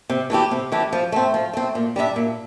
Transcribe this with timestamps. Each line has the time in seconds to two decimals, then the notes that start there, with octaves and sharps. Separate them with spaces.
0.10 C3
0.30 E3 A3 E4 G4
0.51 C3
0.72 E3 A3 E4 G4
0.92 F3
1.12 A3 C4
1.34 F3
1.54 A3 C4
1.75 A#2
1.96 G3 D4 A4 E5
2.16 A#2